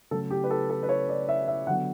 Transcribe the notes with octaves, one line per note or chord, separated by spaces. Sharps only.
C#3 F#3 A3 A4
G4
B4
A4
A4
B4
C#5
D5
E5
E5
D3 F#3 B3 F#5